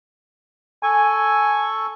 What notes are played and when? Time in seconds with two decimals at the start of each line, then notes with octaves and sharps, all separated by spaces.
0.83 A4 G#5 C#6